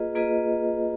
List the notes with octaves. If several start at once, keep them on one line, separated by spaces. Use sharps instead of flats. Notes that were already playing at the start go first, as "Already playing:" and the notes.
Already playing: A#3 F4 G#4 B4 D#5
A#3 F4 G#4 B4 D#5